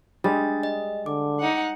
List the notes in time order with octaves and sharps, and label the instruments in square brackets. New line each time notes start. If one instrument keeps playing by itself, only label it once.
[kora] G3 G#3 [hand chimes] D4 A6
[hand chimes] D#5
[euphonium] D3 [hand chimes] D6
[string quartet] D#4 F#5